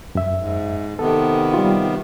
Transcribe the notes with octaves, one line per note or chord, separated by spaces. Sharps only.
F#2 E5
G#2
C3 D#3 B3 A4
G3 F4